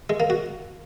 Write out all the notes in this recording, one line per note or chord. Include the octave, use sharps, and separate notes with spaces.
G#3
A#3
F#4